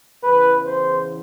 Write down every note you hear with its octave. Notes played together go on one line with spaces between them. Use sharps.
E2 C#3 E3 B4
C5